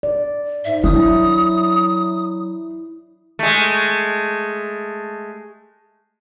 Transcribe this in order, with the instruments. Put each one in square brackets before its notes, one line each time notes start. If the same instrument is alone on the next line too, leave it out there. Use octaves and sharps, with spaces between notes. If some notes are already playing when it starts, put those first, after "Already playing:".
[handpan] D5
[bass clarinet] G#2 [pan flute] E5
[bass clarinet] F#3 [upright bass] D4 [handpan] E4 [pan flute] D#6
[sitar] G#3 A3